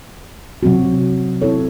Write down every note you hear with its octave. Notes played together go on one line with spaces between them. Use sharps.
C3 F#3 C4 F#4
C4 E4 A4 C#5